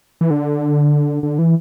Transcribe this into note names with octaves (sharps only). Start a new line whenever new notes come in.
E3
D3
D3
E3